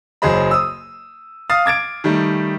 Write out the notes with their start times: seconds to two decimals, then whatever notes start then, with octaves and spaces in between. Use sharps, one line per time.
0.22 F#1 F#3 G#4 C5 D#5 B5
0.51 D#6 E6
1.49 F5 D#6 F6 A6
1.66 D6 G#6 A6 D7
2.04 D#3 G3 A3